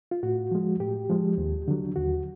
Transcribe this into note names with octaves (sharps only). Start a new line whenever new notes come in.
F4
A2 F#4
F3 G#3
A2 G4
F3 G#3
D#2
D3 F#3
D#2 F#4